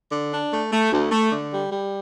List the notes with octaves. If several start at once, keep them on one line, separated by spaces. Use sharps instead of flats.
D3
D4
A3
A3
D2
A3
D3
G3
G3